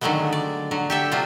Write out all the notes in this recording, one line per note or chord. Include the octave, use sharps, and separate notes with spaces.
D3 D#3 F#3 G#3 A3 B3
D5
D3 F#3
G4 A4 E5
C3 F#3 D4 F4